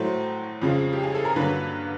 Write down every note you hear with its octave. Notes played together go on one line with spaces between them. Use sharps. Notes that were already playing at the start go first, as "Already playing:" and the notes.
Already playing: A2 F#3 A3 C5
F2 C#3 F3 G#3
G4
G#4
A4
A#4
G2 D3 F#3 A#3 B4